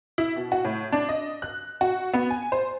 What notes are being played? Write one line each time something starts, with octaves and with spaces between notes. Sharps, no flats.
E4
B2
F#4
A2
D4
D#5
F#6
F#4
B3
G#5
C5